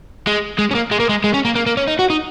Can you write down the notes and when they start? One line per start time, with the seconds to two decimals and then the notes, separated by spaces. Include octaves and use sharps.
0.27 G#3
0.59 G#3
0.71 C#4
0.75 A#3
0.91 G#3
1.00 A#3
1.09 G#3
1.24 G#3
1.34 C#4
1.45 A#3
1.56 A#3
1.66 A#3
1.77 C#4
1.88 D#4
1.99 F#4
2.10 D#4